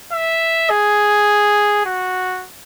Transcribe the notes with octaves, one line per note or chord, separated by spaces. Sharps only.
E5
G#4
F#4